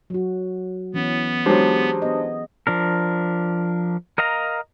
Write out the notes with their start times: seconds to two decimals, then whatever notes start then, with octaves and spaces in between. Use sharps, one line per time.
0.10 F#3 F#4
0.94 E3 B3 C#4
1.46 F#3 G#3 D4 G4 G#4 C5
2.02 B3 D#5
2.67 F3 D4 A#4
4.18 A#4 D#5 F5 A#5